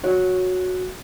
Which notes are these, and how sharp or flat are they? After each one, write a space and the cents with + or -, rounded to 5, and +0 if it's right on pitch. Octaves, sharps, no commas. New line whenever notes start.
F#4 -10 C#5 +0